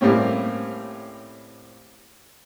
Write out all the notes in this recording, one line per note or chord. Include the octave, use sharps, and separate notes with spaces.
A2 G3 A#3 C4 C#4